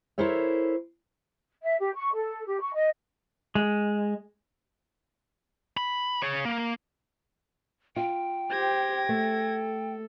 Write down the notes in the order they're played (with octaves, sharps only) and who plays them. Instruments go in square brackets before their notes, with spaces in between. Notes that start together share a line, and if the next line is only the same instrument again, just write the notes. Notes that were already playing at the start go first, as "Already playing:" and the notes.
[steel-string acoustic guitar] E4 A4 A#4 C5 C#5 E5
[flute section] E5
G4
C#6
A4
G4
C#6
D#5
[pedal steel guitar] G#3
[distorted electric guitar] B5
G#4 C#5
A#3
[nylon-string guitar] F4 [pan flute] G5
[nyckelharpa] G4 C5 [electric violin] G#6 A#6
[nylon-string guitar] A3 [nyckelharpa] A4